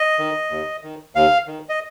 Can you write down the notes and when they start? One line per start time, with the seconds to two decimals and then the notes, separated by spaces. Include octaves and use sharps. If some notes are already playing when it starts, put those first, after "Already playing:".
Already playing: D#5
0.19 D#3
0.51 D#2
0.84 D#3
1.15 D#2 F5
1.47 D#3
1.69 D#5